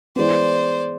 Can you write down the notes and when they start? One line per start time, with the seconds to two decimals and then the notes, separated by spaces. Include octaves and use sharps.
0.16 E3 G#3 B3 C5 D5